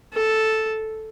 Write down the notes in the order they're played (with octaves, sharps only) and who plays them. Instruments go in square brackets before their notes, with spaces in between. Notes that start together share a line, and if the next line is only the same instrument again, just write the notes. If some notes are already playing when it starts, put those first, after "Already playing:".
[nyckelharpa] A4